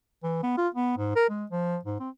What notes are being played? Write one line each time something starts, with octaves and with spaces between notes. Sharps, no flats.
E3
B3
F4
B3
G#2
A#4
G#3
F3
G#2
C4